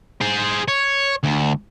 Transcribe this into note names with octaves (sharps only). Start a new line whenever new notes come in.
G#4 C5
C#5
D2